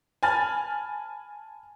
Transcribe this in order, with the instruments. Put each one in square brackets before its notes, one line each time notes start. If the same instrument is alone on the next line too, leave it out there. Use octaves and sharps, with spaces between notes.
[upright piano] G#5 A5 B5 F6 A6